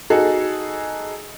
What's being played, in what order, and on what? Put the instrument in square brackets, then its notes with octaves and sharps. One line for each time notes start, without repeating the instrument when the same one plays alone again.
[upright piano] D#4 F#4 G#4 A4